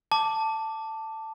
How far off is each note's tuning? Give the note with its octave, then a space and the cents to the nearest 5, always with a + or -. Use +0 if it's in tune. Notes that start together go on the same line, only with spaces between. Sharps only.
A5 +10 D6 +0